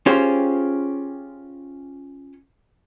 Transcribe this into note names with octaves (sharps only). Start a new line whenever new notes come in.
C#4 F4 G4 G#4 C5